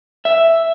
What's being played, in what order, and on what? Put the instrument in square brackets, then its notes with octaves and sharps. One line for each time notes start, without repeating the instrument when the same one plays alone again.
[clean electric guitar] E5